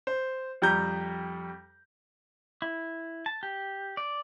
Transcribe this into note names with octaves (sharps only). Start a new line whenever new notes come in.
C5
F2 G3 A#5 G6
E4
A5
G4
D5